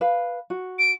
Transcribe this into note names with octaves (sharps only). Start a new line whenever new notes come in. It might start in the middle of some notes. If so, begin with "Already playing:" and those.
B4 F5
F#4
D7